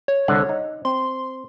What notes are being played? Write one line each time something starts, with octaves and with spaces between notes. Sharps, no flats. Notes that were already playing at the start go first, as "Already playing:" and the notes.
C#5
C2 D3 F#5
D#4
C4 C6